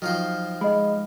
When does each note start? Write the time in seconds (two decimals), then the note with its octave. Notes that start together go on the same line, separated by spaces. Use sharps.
0.02 D#3 F3 F#3 C5
0.61 G#3 D#5 B5